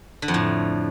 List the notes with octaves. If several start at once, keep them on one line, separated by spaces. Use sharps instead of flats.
D3
F2
A2